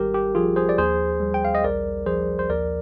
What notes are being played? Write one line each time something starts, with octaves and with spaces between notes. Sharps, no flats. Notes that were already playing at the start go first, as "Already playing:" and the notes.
Already playing: G#1 G3 G4 A#4
G4
F3 F4 G#4
G#4 C5
D5
D#2 G#4 C5
G3
G5
F5
D#5
A#1 A#4 D5
F3 G#4 C5
C5
D#2 A#4 D5